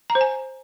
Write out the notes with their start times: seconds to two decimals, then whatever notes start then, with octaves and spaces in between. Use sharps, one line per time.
0.10 A#5
0.15 C5
0.21 G#5